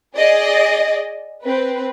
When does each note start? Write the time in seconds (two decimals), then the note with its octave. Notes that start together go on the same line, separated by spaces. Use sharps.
0.16 G#4 D5 D#5
1.42 C4 B4